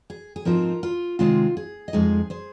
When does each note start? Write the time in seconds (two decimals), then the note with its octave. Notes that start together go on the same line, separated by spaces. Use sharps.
0.10 G#4
0.36 G#4
0.45 G#2 F3 C4 D#4 F4 A#4
0.83 F4
1.19 C3 D#3 G#3 C4 D#4 F4
1.57 G#4
1.88 D#5
1.93 F2 F3 G#3 D#4 G#4 C5
2.30 G#4 C5